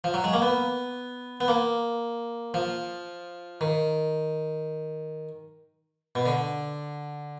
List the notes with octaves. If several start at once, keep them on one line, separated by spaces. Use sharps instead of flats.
F3
F#3
G#3
A#3
B3
B3
A#3
F3
D#3
B2
D3